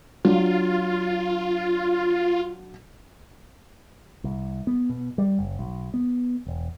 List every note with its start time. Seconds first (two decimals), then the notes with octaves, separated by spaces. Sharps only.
0.25 F#3 D4 F4
4.24 C2
4.67 B3
4.90 B2
5.18 G3
5.39 F#1
5.59 B1
5.94 B3
6.47 E1